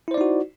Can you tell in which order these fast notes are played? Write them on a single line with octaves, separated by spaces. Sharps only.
E4 C5 D5 D#4 F#4